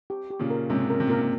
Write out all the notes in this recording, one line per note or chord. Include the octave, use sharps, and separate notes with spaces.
G4
G4
A#2 C#3
A#4
G#2 C3 C#4
A#4
C3
A#2 A#4
A#2